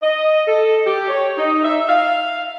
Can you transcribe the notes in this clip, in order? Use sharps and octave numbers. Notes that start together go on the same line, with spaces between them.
D#5
A4
G4
C#5
D#4
E5
F5